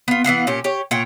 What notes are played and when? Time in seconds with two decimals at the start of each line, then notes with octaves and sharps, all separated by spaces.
0.08 B3 F4
0.24 E3 B3 F5 F#5
0.47 A#2 C#4 G4
0.64 G4 C#5
0.91 A#2 C#5 F#5 G5